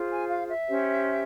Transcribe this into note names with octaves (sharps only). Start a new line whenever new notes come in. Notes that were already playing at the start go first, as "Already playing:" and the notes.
Already playing: F4 G#4 C5
G#5
F5
E5
C#4 G4 C5